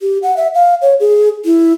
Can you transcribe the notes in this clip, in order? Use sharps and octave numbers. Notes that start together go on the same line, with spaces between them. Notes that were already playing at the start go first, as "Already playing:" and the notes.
G4
F#5
E5
F5
C#5
G#4
E4